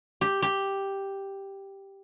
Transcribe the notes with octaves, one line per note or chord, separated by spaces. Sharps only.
G4
G4